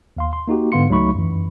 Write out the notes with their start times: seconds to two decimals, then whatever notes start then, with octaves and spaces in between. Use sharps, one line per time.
0.17 D#2 F5 C6
0.33 C6
0.48 A#3 D#4 F#4 G4
0.72 G#2 D3 B3 F5 C6 C#7
0.89 C#2 F#3 A3 D#4 B5 C#6
1.15 F#2 E3